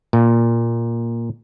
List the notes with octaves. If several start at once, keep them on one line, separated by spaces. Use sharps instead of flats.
A#2